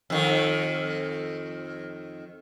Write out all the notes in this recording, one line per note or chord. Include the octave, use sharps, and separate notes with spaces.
F2 D#3